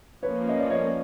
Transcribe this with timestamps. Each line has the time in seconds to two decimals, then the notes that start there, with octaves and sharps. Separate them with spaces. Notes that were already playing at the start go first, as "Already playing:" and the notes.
0.23 F3 A#3 C#4 B4 C#5
0.49 D#5
0.60 D5
0.70 C#5 D#5